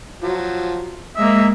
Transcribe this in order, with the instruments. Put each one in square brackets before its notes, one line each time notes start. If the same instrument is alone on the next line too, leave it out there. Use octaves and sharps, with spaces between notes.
[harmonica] F3 F#3
[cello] G#3 A#3 [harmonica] D#5 E5